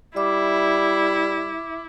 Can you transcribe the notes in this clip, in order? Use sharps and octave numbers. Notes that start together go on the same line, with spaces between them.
G3 E4 E5 D6